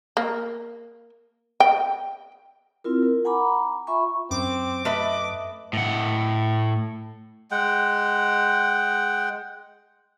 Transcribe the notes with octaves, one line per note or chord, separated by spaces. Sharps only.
A#3
G5
C4 E4 F4 A#4
A#4
F#5 G#5 A#5 B5 D6
F4 E5 G#5 B5 C#6
F#2 C4 D6
A3 B4 D#5 E5
A2 F#5
G#3 F#5 G5